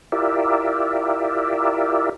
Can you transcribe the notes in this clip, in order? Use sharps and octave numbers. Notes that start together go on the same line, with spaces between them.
E4 F4 G4 A#4 D5 E5